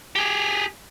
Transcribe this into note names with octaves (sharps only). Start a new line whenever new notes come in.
G4 G#4